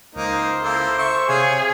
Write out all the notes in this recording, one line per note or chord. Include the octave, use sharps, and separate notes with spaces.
C#2 A#3 D#4 A#4 C5
A#3 E4 A4
E5 C#6
C3 G#4 C#5 F5